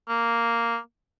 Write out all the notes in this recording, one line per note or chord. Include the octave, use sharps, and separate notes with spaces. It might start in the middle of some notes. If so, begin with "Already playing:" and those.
A#3